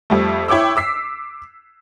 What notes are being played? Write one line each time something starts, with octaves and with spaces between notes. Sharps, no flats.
F2 G3 A3
E4 C#5 G5 D6 E6
D6 E6 B6 C7